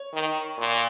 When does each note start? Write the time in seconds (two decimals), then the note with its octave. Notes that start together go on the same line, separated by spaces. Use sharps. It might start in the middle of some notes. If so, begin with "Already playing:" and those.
Already playing: C#5
0.14 D#3
0.58 A#2